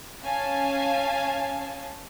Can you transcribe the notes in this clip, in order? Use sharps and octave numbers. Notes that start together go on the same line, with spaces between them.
C#4 F5 G#5 A5